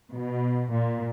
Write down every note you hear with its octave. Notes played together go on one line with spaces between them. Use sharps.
B2
A#2